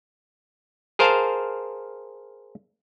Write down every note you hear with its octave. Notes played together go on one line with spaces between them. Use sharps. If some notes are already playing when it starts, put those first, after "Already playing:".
G#4 A#4 C5 F5 A5